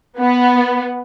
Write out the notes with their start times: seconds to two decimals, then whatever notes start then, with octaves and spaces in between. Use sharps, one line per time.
0.20 B3